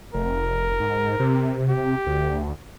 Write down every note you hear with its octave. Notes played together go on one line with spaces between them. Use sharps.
F1 A#4
G#2
C3
G4
D2